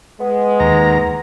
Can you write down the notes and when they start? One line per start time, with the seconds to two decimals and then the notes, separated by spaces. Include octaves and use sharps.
0.20 G#3 B3
0.60 D#2 A#5